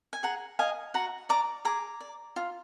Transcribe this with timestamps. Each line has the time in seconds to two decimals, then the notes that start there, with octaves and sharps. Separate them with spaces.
0.13 G#5
0.23 G#4 F#5 A#5
0.59 D#5 F5 G#5
0.94 F#4 F#5 A#5
1.29 D5 A#5 D6
1.65 G#4 A#5 D6
2.00 D5
2.36 F4